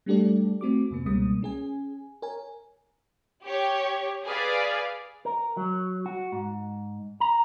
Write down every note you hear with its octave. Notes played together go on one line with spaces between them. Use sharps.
G3 A3 D4 G4 A4 D5
A3 C4 F#4 D6
F2 C3 A#3
C#2 B2 G3 G#3 A#3 D#6
C#4 G#4 G#5
A#4 C#5 G#5
G4 C#5
G#4 B4 D5 F5
A#4
F#3
F#4
G#2
A#5